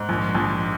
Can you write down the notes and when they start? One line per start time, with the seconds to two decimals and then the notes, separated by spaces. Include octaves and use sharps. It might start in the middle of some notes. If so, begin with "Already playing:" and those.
Already playing: G#2
0.09 A#1
0.35 A#1